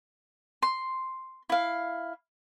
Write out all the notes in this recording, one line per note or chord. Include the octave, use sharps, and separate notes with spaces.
C6
E4 F5